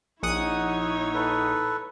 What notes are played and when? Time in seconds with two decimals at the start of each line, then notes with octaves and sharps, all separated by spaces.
0.23 A#1 D#4 E4 C#5 F#5 D#6
1.14 A4 B4